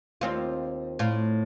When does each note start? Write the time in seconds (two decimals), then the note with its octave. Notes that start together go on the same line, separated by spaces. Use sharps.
0.21 D#2 C4 F4
0.99 A2 F4